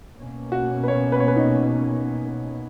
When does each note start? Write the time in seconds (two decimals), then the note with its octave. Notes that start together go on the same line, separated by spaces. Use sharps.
0.16 B2 A#3 C#4
0.52 F#4
0.84 B4
0.88 C#5
1.12 B4
1.20 C#5
1.28 B4
1.36 D#4